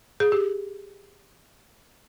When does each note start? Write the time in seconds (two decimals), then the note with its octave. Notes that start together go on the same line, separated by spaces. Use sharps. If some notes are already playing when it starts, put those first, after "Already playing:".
0.20 G#4
0.32 G4